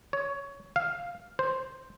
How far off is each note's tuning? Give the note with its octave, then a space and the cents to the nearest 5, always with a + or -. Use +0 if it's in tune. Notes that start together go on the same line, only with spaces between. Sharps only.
C#5 +15
F5 +0
C5 +0